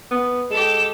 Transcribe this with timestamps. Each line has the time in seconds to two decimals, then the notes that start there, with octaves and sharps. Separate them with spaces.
0.11 B3
0.50 G#3 G4 A4 E7